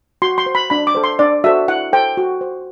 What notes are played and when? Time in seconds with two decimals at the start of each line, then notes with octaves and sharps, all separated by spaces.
0.22 F#4 C6
0.38 C6
0.46 C5
0.55 B5
0.70 D4 B5
0.87 D6
0.95 A4 C5
1.04 C6
1.19 D4 D5
1.44 F#4 A4 C5 E5
1.68 E4 F#5
1.93 A4 C5 G5
2.17 F#4
2.41 C5